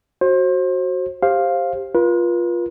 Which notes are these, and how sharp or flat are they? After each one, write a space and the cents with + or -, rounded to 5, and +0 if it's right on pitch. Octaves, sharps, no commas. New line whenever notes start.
F#4 +0 C5 +30
G4 +10 C5 +20 F5 +0
F4 +0 B4 -40